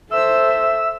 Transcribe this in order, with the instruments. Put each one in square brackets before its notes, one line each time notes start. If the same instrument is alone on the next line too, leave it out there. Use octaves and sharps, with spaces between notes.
[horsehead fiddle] A4 C5 [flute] E5 [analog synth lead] E6